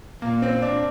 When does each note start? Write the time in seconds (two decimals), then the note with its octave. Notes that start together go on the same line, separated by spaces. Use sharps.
0.21 A#2 A#3
0.42 C4
0.62 D4